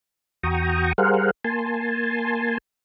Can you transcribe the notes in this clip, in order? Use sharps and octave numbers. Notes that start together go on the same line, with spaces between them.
E2 F#4 G5 A#5 C#6 D#6
G3 G#4 A#4 C5 F5 F#5
A#3 G#5 A5 C6